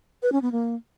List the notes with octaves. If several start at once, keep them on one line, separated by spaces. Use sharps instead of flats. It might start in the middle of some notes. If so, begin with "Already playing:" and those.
B4
C#4
B3
A#3